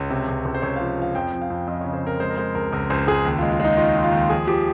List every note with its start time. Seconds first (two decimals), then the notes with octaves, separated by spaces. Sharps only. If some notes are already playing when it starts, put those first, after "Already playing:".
Already playing: C#2 C#5
0.10 C3
0.28 C#2
0.45 C#2
0.54 C5
0.62 C#2 C#5
0.76 F3 F5
0.98 F3 F5
1.15 F2 G5
1.33 F2
1.42 F5
1.50 F2
1.67 F2 D#5
1.81 C#3 C#5
1.93 C5
2.03 F2 A#4
2.20 G#3 C5
2.30 A#4
2.37 G#3 C5
2.55 C#2 A#4
2.72 C#2 A#4
2.90 C#2 C5
3.07 C#2 G#4
3.25 D#2
3.38 G#3 F4
3.52 F4
3.60 G#3 D#4
3.77 D#3 F4
3.95 D#3
4.04 F4
4.12 D#2
4.30 F3 G#4
4.47 F3 G4